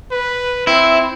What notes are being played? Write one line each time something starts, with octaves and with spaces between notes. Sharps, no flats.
B4
C4 E4